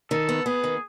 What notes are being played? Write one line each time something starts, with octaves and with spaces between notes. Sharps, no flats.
D#3 A4
B3
B3 G#4
D#3